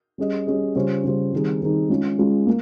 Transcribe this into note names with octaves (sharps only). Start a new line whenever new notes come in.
G3 C#4 G#4 D#5
G3 C#4 G#4 D#5
C#3 G3 C#4 F4 C5
C#3 G3 C#4 F4 C5
D#3 G3 C4 D#4 G#4
D#3 G3 C4 D#4 G#4
G#3 C#4 F4
G#3 C#4 F4
A#3